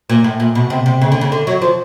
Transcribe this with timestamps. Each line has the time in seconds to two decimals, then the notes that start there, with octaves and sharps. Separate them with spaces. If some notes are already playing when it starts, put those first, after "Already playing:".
0.10 A#2
0.24 A2
0.40 A#2
0.55 B2
0.70 C3
0.86 C3
1.01 C#3
1.12 D3
1.21 C#3
1.32 D3
1.47 F#3
1.62 F3